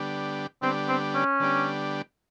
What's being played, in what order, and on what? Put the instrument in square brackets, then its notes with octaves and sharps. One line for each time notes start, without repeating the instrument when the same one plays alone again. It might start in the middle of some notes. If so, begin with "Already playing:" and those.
Already playing: [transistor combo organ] D3 G3 B3 D4 G4
[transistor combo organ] D3 G3 B3 D4 G4 [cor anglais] C4
[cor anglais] C4
C#4
[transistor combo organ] D3 G3 B3 D4 G4